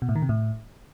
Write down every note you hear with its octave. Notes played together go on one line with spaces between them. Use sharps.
B2
A2
D#3
C3
A2